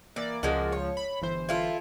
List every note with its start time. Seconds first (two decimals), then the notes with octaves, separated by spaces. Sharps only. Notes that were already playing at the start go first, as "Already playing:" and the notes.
0.16 E3 A#3 D5
0.43 C#2 F3 G#3 A#3 F#4
0.72 C#5
0.97 B5
1.22 G1 E3 C5
1.49 E4 F4 A4